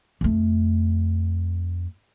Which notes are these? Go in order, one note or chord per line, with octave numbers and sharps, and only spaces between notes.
F2 A3